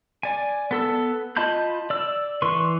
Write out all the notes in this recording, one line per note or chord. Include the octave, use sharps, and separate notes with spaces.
D5 G#5
B3 A4 E6
F4 D#5 A5 B5 G6
D5 E6
E3 B4 C6 C#6